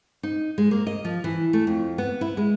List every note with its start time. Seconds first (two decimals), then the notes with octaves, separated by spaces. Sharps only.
0.23 D#4
0.58 G#3
0.71 A#3
0.87 D#5
1.05 F3
1.24 E3
1.53 A3
1.67 F2
1.98 B3
2.21 E4
2.37 G#3